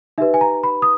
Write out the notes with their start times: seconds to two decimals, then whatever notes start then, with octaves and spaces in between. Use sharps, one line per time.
0.18 D#4 G4 B4 E5
0.34 G#5
0.41 A#5
0.63 B5
0.82 D#6